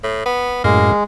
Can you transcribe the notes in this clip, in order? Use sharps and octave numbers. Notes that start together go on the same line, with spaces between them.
A2
B3
F#2 A2 G#3 A#3